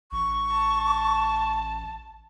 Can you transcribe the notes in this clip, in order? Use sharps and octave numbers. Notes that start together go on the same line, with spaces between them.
A1 C#6
A5